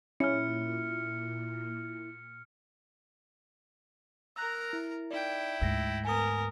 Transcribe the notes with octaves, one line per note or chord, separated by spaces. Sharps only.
A#2 C#4 E4 F6 C#7
A#4 A#5 E6 F#6
E4
D#4 E4 D5 G5
D2 G#2 E6 A#6 C7
B3 A#4 G#5 D#6